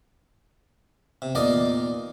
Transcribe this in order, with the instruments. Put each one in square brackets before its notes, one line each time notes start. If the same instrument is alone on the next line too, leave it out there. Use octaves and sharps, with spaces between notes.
[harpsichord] C3
E2 A#2 D#4 D5 D#5 D6